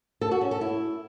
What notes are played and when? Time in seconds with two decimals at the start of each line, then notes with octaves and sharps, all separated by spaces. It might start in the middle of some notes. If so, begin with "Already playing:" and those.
0.21 A4
0.31 F#4
0.41 C#4
0.51 A4
0.61 E4